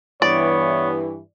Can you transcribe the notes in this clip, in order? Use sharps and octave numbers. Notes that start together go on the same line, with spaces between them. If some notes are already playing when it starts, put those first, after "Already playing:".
G2 E3 B3 C#5 D5